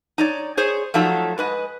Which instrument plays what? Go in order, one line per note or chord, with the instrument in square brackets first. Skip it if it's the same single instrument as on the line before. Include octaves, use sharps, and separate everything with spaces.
[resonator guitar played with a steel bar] D#4 C#5 D5
G#4 C5 C#5
F3 F#3 A3 D#4 E5
G#2 B4 D#5